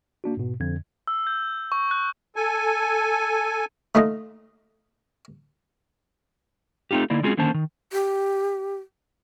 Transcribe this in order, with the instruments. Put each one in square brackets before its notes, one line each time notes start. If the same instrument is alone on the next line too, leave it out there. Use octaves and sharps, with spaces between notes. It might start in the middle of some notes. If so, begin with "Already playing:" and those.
[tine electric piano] A#3 D4 F#4
G#2 B2
F2 D3 G#6
[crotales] E6
G6
C#6
F#6
[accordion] A4 G#5
[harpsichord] A3 D#4 F4 D#5
[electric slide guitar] A3 C4 D#4 F4 G4
D3 A#3 D#4 E4 D5
G#3 C4 C#4 F4 F#4 G#4
D3 D#3 A#3 C#4 C5 A5
D#3
[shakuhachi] G4